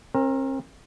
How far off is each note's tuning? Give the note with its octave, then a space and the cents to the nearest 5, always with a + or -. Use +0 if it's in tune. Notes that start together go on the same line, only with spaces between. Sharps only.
C4 +45 A#4 +0